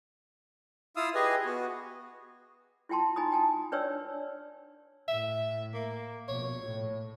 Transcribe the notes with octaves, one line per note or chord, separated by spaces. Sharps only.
E4 F4 F5 D#6 E6
G4 G#4 B4 D#5 G#5
B3 F#4
E4 F4 G5 A5 C6
D#4 G#5 A#5 B5 D#6
G5 A5
D4 B4 C#5 D5 G5 E6
A2 E5
A#3
A#1 B2 C#5
A2